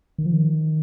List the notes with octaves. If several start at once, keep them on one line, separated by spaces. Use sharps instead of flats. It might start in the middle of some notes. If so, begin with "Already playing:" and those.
D#3
F3
D#3